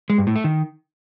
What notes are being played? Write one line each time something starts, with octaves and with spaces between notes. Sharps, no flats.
G#3
G2
A2
A3
D#3